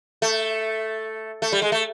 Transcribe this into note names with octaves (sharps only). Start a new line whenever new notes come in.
A3
A3
G3
G#3
A3